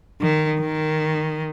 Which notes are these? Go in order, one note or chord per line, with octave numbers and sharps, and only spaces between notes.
D#3
D#3